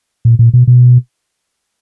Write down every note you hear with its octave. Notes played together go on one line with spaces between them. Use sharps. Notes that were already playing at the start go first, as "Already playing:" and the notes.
A#2
A#2
B2
B2